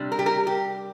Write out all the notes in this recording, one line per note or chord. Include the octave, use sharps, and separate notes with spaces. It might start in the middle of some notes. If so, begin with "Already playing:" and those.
Already playing: C3 G3 D4
A#4
G4
A#4
G4